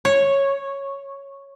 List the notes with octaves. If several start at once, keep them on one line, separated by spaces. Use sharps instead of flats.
C#5